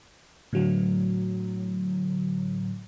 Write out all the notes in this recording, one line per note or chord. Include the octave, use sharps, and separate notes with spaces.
A2 D3 F#3